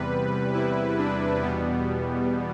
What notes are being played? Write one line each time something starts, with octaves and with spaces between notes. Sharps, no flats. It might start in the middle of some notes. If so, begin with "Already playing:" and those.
Already playing: E2 C3 G3 B4
E4
D4
E2 B2 G3 B3